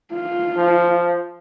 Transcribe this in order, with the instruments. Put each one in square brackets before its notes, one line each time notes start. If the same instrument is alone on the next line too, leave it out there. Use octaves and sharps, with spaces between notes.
[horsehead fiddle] F4
[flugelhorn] F3